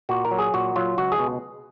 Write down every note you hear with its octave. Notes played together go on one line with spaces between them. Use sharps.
A#2 F#4
A#4
F#3
G#4
A#2 F#4
F#3 F4
C#2 F#4
G#4
B2